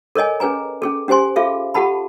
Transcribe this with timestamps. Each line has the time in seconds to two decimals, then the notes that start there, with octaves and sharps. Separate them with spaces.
0.15 A4 A#4 C#5 D#5 G#5
0.40 C#4 G#4 B4 G#5 A#5
0.82 C#4 G#4 A4
1.08 C#4 G4 C5 G#5 C6
1.36 F4 G#4 A4 E5 F5
1.74 F4 G4 A4 F#5 A5 B5